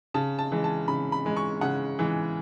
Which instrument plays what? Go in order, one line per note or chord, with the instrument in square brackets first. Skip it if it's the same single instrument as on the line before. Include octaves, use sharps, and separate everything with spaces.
[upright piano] C#3 A5
A5
E3 G#3
A5
C#3 B5
B5
E3 G#3
C#6
C#3 F#5
E3 G#3